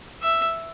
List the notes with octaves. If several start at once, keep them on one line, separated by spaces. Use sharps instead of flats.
E5